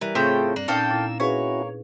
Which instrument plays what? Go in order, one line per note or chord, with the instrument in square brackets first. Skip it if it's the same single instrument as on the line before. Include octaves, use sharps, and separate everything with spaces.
[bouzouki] E3 [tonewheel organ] G3 A#4
[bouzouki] A2 C#3 C5 [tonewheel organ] A3 F4 A4 [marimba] C4 [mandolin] G5
[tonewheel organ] G2 F#6 [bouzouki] A#3 [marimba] D5
[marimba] A#2 C#4 D#4 [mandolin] A4 F5 G5 [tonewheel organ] E6
[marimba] A#2 E4 A6
[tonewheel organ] C#4 E4 F#4 [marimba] G#4 B4 F5 [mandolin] C#5